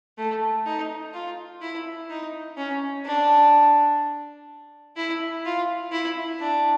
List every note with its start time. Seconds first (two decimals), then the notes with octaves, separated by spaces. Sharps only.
0.18 A3
0.66 D#4
1.14 F4
1.62 E4
2.10 D#4
2.58 C#4
3.05 D4
4.96 E4
5.45 F4
5.92 E4
6.40 D4